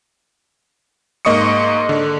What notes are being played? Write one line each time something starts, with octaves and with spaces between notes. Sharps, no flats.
G#2 A#3 D#5 C#6 D#6 C#7
D3